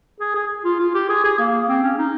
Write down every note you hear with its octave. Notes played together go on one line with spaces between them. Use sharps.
G#4
G#4
F4
F4
G4
G#4
G#4
A#3
C4
C#4
D#4